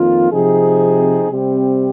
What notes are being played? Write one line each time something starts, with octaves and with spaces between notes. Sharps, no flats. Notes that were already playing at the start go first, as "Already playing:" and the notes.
Already playing: F2 D#3 A#3 F4
C3 F3 C4 D#4 G#4
C3 G3 C4 G4